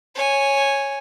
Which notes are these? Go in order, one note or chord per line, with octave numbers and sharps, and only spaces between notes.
C#5 G#5